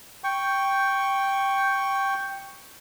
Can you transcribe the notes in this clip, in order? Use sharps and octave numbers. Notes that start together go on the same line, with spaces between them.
G5 C#6